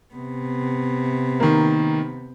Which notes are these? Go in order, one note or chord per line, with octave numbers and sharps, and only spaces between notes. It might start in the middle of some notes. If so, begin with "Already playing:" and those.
C3 B3
D#3 A#3